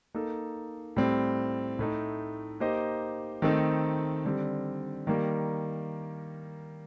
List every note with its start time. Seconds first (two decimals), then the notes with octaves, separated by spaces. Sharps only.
0.15 A#3 D#4 A4
0.96 A2 G3 C4
1.79 A2 A3 D#4
2.60 A#3 D#4 G4 C5 D#5
3.42 D#3 A3 C4 D#4 A4
4.25 D3 G3 C4
5.07 D#3 G3 A#3